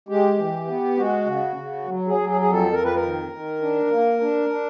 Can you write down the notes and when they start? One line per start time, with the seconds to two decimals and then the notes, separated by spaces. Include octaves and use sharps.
0.08 G#3 G4
0.38 E3
0.67 B3
0.97 G#3 F#4
1.26 C#3
1.56 C#3
1.85 F#3
2.07 G#4
2.15 F#3
2.29 G#4
2.41 F2 G#4
2.52 A4
2.73 F2 A#4
2.84 B4
2.94 A#4
3.02 D#3
3.32 D#3
3.61 D4
3.91 A#3
4.21 D4
4.49 D4